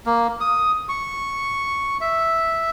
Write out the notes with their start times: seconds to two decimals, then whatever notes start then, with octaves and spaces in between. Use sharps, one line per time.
0.06 A#3
0.41 D#6
0.89 C#6
2.01 E5